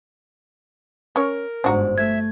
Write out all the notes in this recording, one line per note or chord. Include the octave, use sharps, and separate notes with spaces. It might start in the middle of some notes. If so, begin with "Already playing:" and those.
C#4 A#4 C#5
G1 G#2 D4 F#4 C5 A#5
A3 E5 G#6